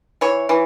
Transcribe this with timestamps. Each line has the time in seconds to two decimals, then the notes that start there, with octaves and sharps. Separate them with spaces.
0.21 E3 C#5
0.49 E3